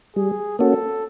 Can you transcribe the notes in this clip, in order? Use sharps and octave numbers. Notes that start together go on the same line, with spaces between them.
G3 G#4
A#3 C#4 F#4 A4